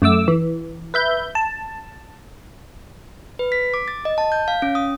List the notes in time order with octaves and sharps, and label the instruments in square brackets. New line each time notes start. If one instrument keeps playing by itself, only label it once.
[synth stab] F#2 A3 D6 E6
E3
B4 E5 G6
A5
[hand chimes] B4
B6
D6
A6
D#5
A5
G6
F5
C#4
D#6